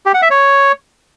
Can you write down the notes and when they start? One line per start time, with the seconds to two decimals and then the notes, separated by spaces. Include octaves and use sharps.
0.06 G4
0.14 F#5
0.22 E5
0.30 C#5